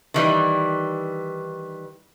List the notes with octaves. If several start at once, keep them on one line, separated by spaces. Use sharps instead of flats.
D#3 E3 G3